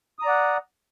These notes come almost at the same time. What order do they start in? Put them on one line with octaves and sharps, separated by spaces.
D#6 A#5 D5 F#5